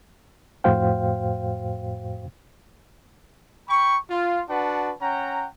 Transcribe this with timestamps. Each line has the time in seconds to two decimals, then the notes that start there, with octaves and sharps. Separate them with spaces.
0.64 F2 A2 F#4 C5 F5 G5
3.69 G5 B5 C#6
4.10 F4
4.49 D4 F#4 B4 F#5 A5
5.01 C#4 F#5 G5 A#5